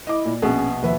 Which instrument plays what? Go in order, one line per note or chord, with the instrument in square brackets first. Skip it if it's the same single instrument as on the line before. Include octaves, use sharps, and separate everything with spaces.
[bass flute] E4 [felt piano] D#5 D6
[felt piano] A#2
[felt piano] A#1 G#4 [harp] B2 [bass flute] C#4
[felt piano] D#2 B4 E5 [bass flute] F3